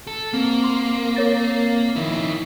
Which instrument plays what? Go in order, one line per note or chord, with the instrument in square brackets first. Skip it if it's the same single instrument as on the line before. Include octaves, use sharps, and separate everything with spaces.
[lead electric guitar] A4
[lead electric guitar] A#3 [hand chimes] C4
[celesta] C6
A#4 C#5 A6
[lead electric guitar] D#3 E4